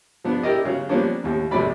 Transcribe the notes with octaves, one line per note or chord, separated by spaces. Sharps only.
F3 B3 D4
E4 G4 A#4 D5 D#5
C#3 F#3
F3 G3 A#3 B3 C#4 D4
D#2 A2
A#1 C3 F#3 A3 D5 B5